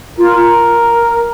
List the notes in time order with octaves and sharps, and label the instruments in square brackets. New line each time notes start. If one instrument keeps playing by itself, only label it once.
[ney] F4 [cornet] A#4